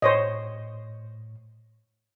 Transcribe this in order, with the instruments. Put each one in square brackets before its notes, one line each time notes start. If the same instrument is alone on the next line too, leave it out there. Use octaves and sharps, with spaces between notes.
[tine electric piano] A2 [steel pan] C5 C#5 D#5